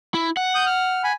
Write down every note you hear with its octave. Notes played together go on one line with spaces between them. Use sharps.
E4
F#5
D#6 G6
F6
G#5 B5